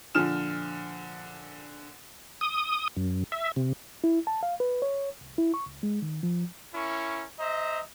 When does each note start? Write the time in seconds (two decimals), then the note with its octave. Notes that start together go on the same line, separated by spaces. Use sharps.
0.15 A#2 D3 F3 F6 E7
2.41 D#6
2.97 F#2
3.32 E5
3.56 C3
4.04 E4
4.27 A5
4.43 F5
4.60 B4
4.82 C#5
5.21 C2
5.38 E4
5.54 C#6
5.66 C#2
5.83 G#3
6.02 D#3
6.23 F3
6.74 C#4 E4 A#4 C#6
7.39 C5 D#5 E5 A#5